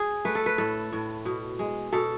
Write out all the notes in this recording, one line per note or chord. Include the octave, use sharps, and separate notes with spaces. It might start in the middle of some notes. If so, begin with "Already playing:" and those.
Already playing: G#4
A3 B4
A4
B4
A2 A4
A2
B2
G#3
B2 A4